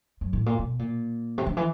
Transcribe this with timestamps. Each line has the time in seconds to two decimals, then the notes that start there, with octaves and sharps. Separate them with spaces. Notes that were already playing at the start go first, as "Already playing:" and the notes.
0.21 F#2
0.33 A2
0.46 A#2
0.59 B2
0.79 A#2
1.38 C3
1.46 D3
1.57 E3